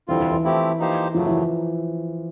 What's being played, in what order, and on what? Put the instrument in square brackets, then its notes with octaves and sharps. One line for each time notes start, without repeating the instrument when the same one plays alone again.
[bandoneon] F2 D3 G3 C4 F4 [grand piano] E3
[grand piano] E3
E3
[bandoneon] F3 A3 C4 E4 G4
F3 A#3 D#4 G4 C5
[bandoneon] F#2 C#3 F#3 A3 [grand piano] F3
[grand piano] E3